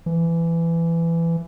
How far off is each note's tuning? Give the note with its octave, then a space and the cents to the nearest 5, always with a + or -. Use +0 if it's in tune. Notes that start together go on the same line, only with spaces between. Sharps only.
E3 +20